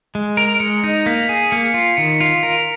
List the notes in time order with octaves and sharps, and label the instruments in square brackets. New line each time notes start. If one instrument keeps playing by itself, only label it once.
[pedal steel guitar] G#3
[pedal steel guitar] A#4 [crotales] F7
[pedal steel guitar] G#3 [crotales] C#7
[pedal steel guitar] D#4
[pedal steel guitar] A#3 [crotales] B6
[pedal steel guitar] G#4
[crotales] B6
[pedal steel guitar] A#3 [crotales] C#7
[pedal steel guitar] F4
[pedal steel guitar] D#3 [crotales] C#7
[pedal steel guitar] F4
A#4